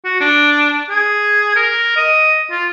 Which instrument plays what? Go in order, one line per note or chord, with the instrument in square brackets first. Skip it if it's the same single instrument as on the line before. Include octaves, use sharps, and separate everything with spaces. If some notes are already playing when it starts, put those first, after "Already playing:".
[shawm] F#4
D4
G#4
A#4
D#5
F4